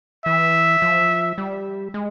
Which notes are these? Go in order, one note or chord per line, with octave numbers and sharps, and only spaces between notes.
E3 E5
F3
G3
G#3